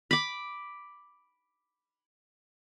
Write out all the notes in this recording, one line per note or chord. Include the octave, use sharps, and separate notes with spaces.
B5 D6